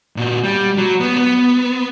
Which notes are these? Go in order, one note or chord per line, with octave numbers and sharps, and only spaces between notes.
A#2 F#4
G3
F#3
B3
B3